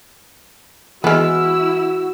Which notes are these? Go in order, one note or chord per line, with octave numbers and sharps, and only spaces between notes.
E3 G#3 B3 E4 F#4 G#5 E6 F6